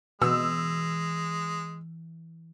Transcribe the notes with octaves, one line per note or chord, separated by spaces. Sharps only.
B2 E3 G#3 E6